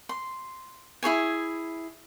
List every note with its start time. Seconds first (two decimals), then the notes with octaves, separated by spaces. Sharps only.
0.09 C6
1.03 E4 G#4 C#5 G#5